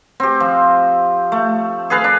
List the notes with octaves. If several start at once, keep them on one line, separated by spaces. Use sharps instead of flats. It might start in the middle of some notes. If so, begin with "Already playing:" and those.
C4 G4
F3
A3
G#4 A4 B4 F5
D4